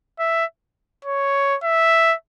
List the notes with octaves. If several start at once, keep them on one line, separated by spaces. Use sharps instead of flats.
E5
C#5
E5